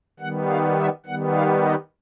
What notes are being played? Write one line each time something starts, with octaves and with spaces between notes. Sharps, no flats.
D#3 G3 B3 F#5
F5
E5
D#3 G3 B3 F#5
F5
D#5